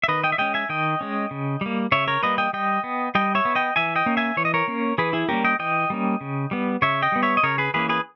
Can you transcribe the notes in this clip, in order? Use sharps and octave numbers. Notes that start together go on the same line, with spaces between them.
E5
D#3 B4 D#5
D#5 G5
E5
G#3 C#4 D#5 G5
E5 G#5
D#3 D#5 G5
G#3 C#4
C#3
G3 A#3
C#3 C#5 E5
A#4 C#5
G3 A#3 B4 D#5
D#5 G5
G3 D#5 G5
B3
G3 D#5 G5
C#5 E5
B3
D#5 G5
E3 E5 G#5
D#5 G5
A#3 C#4
E5 G#5
E3 C#5
D#5
A#4 C#5
A#3 C#4
E3 G#4 B4
E4 G#4
G3 A#3 C#4 G4 A#4
D#5 G5
E3 D#5 G5
G3 A#3 C#4
C#3
G3 B3
C#3 C#5 E5
D#5 G5
G3 B3
C#5 E5
D#5
C#3 A#4 C#5
G#4 B4
E3 A#3 C#4 G#4 B4
G#4 B4